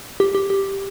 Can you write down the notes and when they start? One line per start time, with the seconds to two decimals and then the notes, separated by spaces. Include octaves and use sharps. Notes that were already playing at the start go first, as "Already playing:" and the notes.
0.20 G4
0.35 G4
0.50 G4